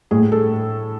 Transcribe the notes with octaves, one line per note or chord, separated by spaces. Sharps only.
A2 G#4
A4